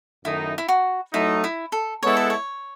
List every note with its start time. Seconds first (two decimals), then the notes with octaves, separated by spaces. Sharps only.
0.24 F#2 D#3 A3 D#4 E4
0.58 E4
0.68 F#4
1.13 F#3 A3 D#4 E4
1.44 E4
1.72 A4
2.02 G#3 B3 E4 A4 C#5
2.17 B4
2.30 C#5